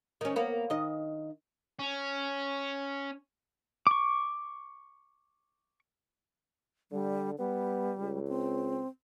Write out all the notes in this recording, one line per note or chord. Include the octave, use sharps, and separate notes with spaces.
D#3 C#4
A#3 B3
D#3 D#5
C#4
C#6 D6
D3 G3
G3 B3
C#2
C4